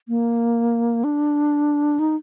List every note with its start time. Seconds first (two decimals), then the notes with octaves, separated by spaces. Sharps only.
0.09 A#3
1.04 D4
1.99 D#4